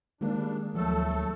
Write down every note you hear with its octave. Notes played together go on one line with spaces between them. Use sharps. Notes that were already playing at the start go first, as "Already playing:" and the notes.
D#3 G3 G#3 A#3 D4 D#4 G#4
D2 F3 F#3 A3 A4